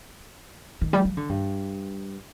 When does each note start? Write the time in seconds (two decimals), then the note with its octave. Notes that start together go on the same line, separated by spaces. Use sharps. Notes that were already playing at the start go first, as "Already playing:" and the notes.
0.81 D#3
0.93 G3
1.05 F3
1.17 D3
1.29 G2